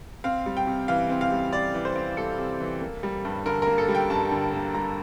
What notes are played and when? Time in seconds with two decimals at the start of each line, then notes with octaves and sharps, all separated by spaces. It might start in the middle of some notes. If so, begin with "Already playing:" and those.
0.24 C4 F5
0.46 G3
0.57 G5
0.67 C3
0.88 E3 F5
1.10 C4
1.21 F5
1.32 G3
1.53 C3 D5
1.74 E3
1.85 C5
1.96 C4
2.17 G3 A4
2.38 C3
2.60 E3
2.81 A#3
3.03 G3
3.25 G2
3.46 D3 A#4
3.62 A#4
3.67 A#3
3.78 A4
3.88 G3
3.95 G5
4.10 G2 A5
4.32 D3
4.53 A#3
4.74 G3 A#5